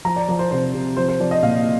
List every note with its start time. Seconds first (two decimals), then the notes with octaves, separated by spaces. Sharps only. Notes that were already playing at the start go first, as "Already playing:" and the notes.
0.05 F3 A#5
0.16 D5
0.28 F3 D5
0.39 C5
0.51 C3 C5
0.74 C3
0.97 F3 C5
1.09 C5
1.20 F3 D5
1.31 D#5
1.43 A#2 F5